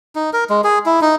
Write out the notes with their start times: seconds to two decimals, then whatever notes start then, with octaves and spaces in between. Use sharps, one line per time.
0.15 D#4
0.33 A#4
0.50 G#3
0.64 G#4
0.86 E4
1.01 D#4